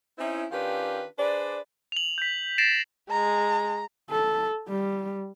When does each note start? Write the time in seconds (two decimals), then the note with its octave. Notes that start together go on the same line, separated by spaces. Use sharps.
0.19 C4 C#4 D#4 E4
0.51 D#3 C#4 D4 F4 G4 B4
1.18 D4 G#4 B4 C5 D5
1.92 F7 F#7
2.18 G6 B6
2.58 A6 A#6 C7 D7 E7
3.11 G#3 A#5
4.11 A4
4.68 G3